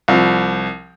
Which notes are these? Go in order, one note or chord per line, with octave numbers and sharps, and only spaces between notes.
C2 F3